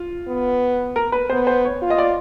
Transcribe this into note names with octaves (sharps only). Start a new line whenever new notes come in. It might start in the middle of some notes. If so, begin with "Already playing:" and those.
Already playing: F4
B3
A#4
B4
B3 C5
C5
C#5
F4
D#5
D5